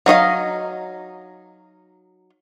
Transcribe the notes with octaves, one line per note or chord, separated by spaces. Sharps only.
F#3 D#4 D#5 F5